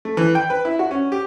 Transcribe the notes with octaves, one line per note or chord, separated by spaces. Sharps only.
A3
E3
G5
B4
E4
F#4
C#4
G4